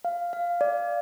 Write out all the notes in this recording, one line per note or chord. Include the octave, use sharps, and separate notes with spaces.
F5
F5
D5